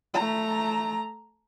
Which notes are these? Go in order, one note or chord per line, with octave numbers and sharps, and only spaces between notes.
A3 A#5